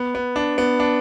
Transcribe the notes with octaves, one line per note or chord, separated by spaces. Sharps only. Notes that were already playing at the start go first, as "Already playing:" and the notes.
Already playing: B3
B3
D4
B3
D4